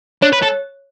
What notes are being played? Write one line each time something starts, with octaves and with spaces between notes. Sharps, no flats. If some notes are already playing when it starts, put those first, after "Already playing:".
D4 C#5
B4
A4